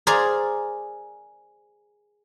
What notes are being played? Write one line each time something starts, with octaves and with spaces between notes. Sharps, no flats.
G#4 A#4 C5 D5